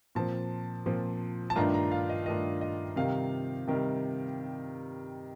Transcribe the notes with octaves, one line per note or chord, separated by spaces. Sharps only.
A#2 F3 C4 A5
A#2 F3 C4
A5
G2 D#3 A3 D4 F4 A#5
A#5
F5
D#5
G2 D#3 A3 D4 F4 D#5
D#5
C3 D#3 G3 F5
C3 D#3 G3